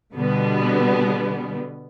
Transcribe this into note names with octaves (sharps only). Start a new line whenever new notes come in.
B2 D3 G3 B3